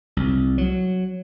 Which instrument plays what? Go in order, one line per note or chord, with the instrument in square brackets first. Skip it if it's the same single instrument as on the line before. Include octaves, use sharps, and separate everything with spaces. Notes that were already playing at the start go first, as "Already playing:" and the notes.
[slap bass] C2
F#3